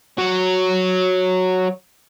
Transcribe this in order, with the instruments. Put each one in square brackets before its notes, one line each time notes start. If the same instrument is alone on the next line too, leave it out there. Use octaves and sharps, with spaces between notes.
[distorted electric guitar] F#3 F#4